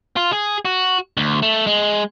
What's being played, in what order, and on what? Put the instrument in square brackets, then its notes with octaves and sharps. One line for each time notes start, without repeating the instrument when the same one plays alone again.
[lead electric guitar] F4
G#4
F#4
D2
A3
G#3